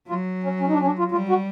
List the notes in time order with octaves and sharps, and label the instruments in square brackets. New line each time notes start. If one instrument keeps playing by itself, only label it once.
[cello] F#3 [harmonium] F4
[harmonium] C#4
C#4
D#4
D4
C#4
D4
F4
[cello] G3 [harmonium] F4
[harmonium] F#4